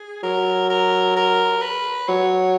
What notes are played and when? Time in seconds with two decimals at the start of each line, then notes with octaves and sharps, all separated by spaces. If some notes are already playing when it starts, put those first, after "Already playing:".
Already playing: G#4
0.23 F#3 A#4
0.70 A#4
1.16 A#4
1.62 B4
2.08 F#3 C#5